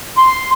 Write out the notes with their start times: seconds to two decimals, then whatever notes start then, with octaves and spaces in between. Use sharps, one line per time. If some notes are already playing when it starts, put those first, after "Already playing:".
0.17 C6